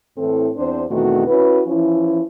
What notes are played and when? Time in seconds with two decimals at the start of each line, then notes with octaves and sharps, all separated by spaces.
0.18 A2 E3 C4 A4
0.57 E2 C4 D4 C5
0.89 E2 B2 D#3 A3 C4 F#4
1.27 C#4 E4 F#4 B4
1.67 E3 F3 C#4 E4